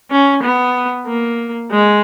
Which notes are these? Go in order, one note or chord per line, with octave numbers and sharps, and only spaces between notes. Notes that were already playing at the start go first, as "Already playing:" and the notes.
C#4
B3
A#3
G#3